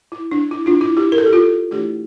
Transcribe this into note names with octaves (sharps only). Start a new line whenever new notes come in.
E4
D4
E4
D4 F4
E4
E4 G4
A#4
A4
G4
F4 A4
E3 A3 D4 E4 G4